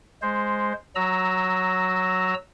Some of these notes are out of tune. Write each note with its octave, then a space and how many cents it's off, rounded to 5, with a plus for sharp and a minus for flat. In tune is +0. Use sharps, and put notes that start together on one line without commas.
G#3 +0 C5 +0
F#3 +0 A#5 +0 E6 -10